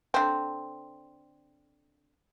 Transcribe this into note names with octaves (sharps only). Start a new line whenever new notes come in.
D3 C4